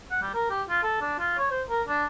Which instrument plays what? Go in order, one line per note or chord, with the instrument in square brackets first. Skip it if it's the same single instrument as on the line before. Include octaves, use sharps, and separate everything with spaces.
[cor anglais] F#5
G3
A#4
G4
F4
A4
D4
F4
C#5
C5
A#4
D4